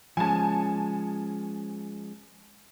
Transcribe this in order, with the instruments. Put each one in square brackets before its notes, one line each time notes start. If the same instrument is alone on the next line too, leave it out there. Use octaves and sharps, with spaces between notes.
[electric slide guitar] F3 G#3 C#4 [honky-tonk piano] G#5 A5